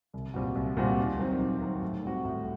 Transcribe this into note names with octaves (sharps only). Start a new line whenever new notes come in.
C2
A#2 G3 C4 F#4
C2
A#2 G3 C4 F#4
D#2
D#3 F#3 C4
D#2
D#3 F#3 C4
A2
G3 C4 F#4
A2